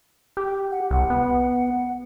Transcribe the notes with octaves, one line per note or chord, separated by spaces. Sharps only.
G4
F#5
C2 F#5
B3